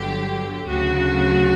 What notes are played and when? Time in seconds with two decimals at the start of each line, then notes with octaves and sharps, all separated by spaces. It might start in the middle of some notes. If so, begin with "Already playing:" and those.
Already playing: G1 G2 D3 F#3 G4
0.67 D2 C#3 F#3 F#4